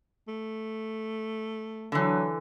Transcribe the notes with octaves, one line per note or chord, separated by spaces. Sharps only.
A3
D3 E3 F#3